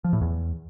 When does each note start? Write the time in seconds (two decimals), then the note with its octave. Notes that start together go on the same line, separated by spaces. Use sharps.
0.04 F3
0.13 A2
0.21 E2